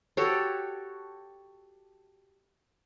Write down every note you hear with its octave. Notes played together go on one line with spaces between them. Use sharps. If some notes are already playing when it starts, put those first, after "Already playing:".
F#4 G4 A4 C#5